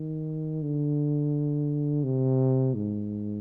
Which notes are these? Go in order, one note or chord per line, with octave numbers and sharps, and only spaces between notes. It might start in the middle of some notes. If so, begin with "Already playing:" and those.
Already playing: D#3
D3
C3
G#2